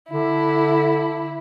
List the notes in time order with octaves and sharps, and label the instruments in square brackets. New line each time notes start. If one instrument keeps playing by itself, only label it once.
[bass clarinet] D3 [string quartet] E4